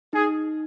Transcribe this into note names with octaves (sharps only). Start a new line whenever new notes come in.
D#4 G#4